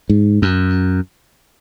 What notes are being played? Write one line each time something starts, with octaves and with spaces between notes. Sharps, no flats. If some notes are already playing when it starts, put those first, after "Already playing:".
G#2
F#2